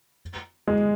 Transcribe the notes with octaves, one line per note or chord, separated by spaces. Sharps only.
G#3